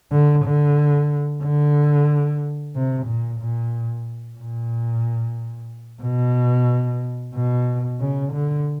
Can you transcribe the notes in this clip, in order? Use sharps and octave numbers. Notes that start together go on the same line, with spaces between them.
D3
D3
D3
C3
A#2
A#2
A#2
B2
B2
C#3
D3